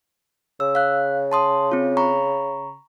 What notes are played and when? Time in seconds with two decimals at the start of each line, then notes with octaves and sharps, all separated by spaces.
0.60 C#3 E6
0.75 F5 F#6
1.32 A5 C6 D#6
1.71 C4 F4
1.97 A#5 B5 C#6